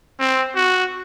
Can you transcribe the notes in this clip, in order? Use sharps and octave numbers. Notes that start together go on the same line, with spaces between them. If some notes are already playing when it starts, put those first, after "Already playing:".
C4
F#4